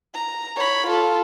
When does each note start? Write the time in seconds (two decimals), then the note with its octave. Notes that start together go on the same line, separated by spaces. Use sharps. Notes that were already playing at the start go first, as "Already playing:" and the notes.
0.14 A#5
0.57 C#5 B5
0.87 F4 A4